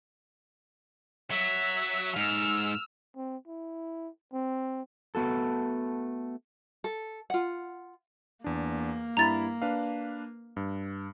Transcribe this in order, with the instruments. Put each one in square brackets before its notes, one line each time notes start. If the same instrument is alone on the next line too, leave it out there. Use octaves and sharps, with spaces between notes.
[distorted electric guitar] F#3 [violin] E5
[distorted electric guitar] G#2 [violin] E6 F6
[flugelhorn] C4
E4
C4
[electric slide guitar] A3 B3 F#4 A4
[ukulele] A4
F4 F#5
[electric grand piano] E2 D4 [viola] A#3
[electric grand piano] G2 E4 B5 [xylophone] A#5 A6
[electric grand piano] D4 B4 F5
G2